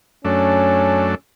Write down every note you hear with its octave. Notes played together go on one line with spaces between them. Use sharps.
F#2 A3 C#4 D4